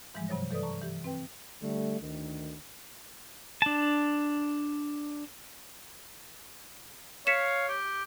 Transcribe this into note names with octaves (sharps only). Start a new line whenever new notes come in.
G#2 E3 F3 G3 G#3
G2 C3 F#3 C5 C#5 A#6
E3 A4 B4 D5 D#6
A5 A#5 C#6
E3 G4
C4 B4 G5
D3 G3 A3
D2 D#3
D4 A5
C#5 F5 B6 C#7 E7
G4